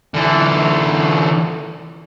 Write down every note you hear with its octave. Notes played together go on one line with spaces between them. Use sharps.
D3 E3